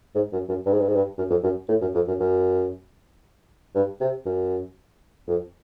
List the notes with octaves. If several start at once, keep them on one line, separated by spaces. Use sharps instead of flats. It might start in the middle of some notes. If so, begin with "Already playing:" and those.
G#2
F#2
F#2
G2
G#2
G2
G#2
G2
F#2
F2
F#2
A2
F#2
F2
F#2
F#2
G2
C3
F#2
F2